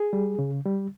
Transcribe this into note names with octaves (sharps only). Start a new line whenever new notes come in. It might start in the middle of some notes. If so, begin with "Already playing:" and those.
Already playing: G#4
G3
C#3
G3